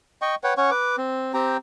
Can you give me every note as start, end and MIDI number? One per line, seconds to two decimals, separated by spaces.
0.22 0.35 75
0.22 0.35 79
0.22 0.35 85
0.44 0.54 71
0.44 0.54 73
0.44 0.54 78
0.44 0.54 79
0.57 0.70 61
0.57 0.70 73
0.57 0.70 78
0.57 0.70 85
0.71 0.96 71
0.71 0.96 86
0.98 1.32 60
1.34 1.57 60
1.34 1.57 67
1.34 1.57 79
1.34 1.57 82